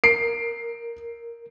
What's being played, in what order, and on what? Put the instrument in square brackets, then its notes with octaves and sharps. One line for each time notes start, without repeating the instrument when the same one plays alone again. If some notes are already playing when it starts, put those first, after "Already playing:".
[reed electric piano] A#4 [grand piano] C7 D7